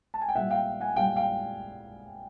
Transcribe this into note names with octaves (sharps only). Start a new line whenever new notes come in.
A5
G#5
G5
A#2 G3 E5 F#5
F5 G5
F#5 G#5
A#2 G3 F5 G5
F5 G5